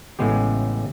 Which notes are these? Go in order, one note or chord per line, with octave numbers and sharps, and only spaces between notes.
A1 A2 C#3 G#3 B3 G4